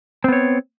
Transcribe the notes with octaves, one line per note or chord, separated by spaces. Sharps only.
B3 C4 C#5